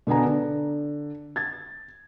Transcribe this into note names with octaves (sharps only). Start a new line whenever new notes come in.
B2 D3 B3 G#5 A#5
D3
G#6 A6